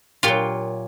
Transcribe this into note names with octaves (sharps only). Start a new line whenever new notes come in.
A#2 F#3 F4 G4